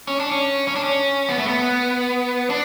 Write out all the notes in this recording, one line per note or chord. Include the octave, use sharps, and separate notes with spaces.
C#4
D4
C#4
C#4
D4
C#4
B3
A3
B3
D4